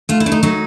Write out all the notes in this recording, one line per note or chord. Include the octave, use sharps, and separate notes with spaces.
A3 F4
E4
A3 D4
D#4
F#3 D#4